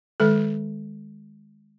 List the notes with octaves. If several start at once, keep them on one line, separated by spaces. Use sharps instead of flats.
D#3 G#3 A4